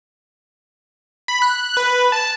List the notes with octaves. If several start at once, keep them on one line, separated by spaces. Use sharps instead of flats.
B5
F#6
B4
A5